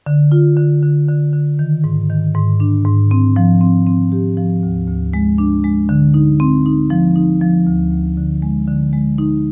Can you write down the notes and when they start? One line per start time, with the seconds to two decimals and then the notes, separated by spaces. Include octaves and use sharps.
0.06 D3
0.32 F4
0.57 D3
0.82 D3
1.09 D3
1.33 D3
1.59 D#3
1.84 G#2
2.10 D#3
2.34 G#2
2.60 D4
2.85 G#2
3.11 C4
3.36 F3
3.61 C4
3.87 C4
4.12 G4
4.37 F3
4.63 D2
4.88 D2
5.13 G#3
5.38 D4
5.64 G#3
5.89 D3
6.14 D#4
6.40 C4
6.66 D#4
6.90 F3
7.16 D#4
7.41 F3
7.66 D2
7.92 D2
8.17 D3
8.42 G#3
8.68 D3
8.93 G#3
9.18 D#4